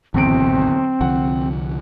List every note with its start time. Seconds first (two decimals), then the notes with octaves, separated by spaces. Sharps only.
0.14 D1 G#1 E2 B2 C4 D7
1.01 C2 D3 F3 F#5